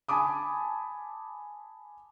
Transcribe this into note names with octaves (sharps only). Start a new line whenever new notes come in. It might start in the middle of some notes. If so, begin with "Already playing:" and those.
G#5 A5 B5 D6 D#6